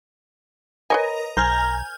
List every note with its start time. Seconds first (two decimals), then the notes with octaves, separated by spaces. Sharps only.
0.90 A#4 B4 C#5 D#5 G#5
1.37 B1 C5 G#5 A#5 F6 G6